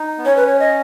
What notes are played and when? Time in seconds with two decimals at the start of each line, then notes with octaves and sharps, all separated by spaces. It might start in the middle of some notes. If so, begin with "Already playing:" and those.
Already playing: D#4
0.18 B3
0.25 C#4 C#5
0.36 B4
0.47 C#5
0.60 D#5